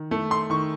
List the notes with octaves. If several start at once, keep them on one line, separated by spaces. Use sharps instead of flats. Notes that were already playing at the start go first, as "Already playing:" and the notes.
Already playing: D#3
A3
C6
D#3 C#6